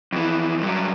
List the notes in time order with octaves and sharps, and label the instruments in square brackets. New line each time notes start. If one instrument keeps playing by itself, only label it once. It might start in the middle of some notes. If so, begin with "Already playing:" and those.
[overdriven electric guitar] F2 E3
G2 F#3